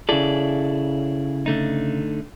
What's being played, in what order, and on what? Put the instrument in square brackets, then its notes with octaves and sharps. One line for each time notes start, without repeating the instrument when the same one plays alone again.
[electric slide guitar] C#3 A4 [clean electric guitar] E4 G#4 D5
[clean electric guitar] D3 A3 D#4